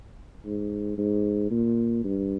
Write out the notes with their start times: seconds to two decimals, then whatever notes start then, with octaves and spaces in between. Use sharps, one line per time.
0.45 G#2
0.98 G#2
1.50 A#2
2.04 G2